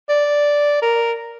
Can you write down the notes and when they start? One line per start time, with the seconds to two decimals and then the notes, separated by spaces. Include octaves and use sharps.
0.09 D5
0.82 A#4